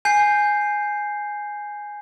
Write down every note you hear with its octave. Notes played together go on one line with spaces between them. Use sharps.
G#5 G6 C7